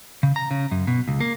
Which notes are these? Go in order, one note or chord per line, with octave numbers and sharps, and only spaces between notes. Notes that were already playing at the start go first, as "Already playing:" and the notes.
C#3
A#5
C#3
F#2
B2
C#2
A#3